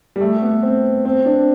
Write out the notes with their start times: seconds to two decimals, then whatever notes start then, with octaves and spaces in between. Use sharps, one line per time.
0.16 G3
0.21 A3
0.42 B3
0.63 C4
1.05 C4
1.25 D4